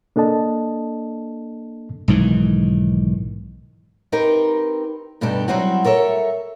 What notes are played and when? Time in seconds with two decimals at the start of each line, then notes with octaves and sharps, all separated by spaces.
0.16 A#3 D4 A4 D#5 A5
2.08 B1 G#2 D#3 E3
4.12 C4 D#4 G4 A#4 B4
5.21 G2 B2 D4 D#4 G4 A4
5.48 F#3 G3 C4 E4 F#4
5.84 A4 A#4 C#5 E5